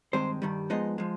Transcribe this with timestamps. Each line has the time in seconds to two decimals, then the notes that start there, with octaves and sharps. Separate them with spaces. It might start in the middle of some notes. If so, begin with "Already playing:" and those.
0.13 G2 D#3 G#3 C4 C5
0.42 G2 D#3 G3
0.70 G#2 F3 G#3 B3 D#4 D#5
0.98 F3 G#3